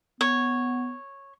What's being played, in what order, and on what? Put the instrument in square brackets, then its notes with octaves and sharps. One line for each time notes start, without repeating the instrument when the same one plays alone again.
[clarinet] B3 [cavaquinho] C#5